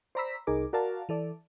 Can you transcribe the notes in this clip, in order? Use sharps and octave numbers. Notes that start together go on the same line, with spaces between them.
C5 D5 A#5 B5 E6 B6
C2 D#4 G#4 A#4 D6
F#4 A#4 D5 F5 A5
E3 A4 D5